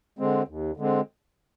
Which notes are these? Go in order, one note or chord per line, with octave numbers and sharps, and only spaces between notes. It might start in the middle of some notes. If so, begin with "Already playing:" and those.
D3 G#3 C4
D#2
D3 G#3 C4